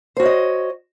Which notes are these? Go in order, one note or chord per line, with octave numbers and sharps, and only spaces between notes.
F#4 C5 C#5 D#5